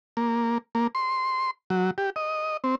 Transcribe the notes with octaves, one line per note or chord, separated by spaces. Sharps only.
A#3
A#3
C6
F#3
G4
D#5
C4